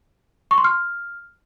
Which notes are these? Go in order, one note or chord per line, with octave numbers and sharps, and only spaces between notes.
C#6
C6
F6